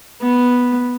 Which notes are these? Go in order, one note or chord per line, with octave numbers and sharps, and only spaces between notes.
B3